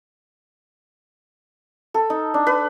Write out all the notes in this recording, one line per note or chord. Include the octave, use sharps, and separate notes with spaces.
A4
D#4
D4
B4